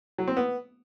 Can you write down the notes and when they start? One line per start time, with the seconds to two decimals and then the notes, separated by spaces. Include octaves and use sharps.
0.18 F#3
0.28 C4
0.37 B3